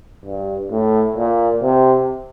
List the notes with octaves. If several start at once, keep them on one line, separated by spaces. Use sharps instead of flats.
G2
A2
A#2
C3